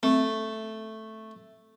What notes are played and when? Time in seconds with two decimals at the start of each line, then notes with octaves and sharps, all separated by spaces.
0.03 A3 C4